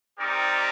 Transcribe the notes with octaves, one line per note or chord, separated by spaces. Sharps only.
C4 D#4 G4 A#4 D5